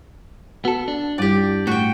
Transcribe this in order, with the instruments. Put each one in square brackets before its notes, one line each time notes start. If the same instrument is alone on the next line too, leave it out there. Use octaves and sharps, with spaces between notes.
[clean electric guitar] B3 A4 [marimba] F#4
[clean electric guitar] D4
[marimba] G2 G3 E4 [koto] G4 D5
[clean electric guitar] A2 [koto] F#4 G5